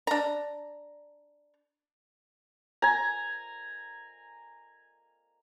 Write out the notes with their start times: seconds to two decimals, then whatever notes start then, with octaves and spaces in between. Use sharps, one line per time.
0.07 D4 A#5
2.82 G#5 A#5